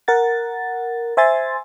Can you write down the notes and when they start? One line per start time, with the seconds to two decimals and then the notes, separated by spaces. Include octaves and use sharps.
0.08 A#4 F#5 A6
1.17 C5 E5 G#5 C6 A6